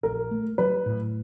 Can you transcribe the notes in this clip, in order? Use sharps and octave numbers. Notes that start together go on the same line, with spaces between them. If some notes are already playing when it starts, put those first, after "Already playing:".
A#1 A#4
A3
F#3 B4
A2